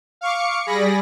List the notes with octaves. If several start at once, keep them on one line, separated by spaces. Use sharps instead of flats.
F5 C#6 D6 C#7
G3 G#4 D5 B5 A#6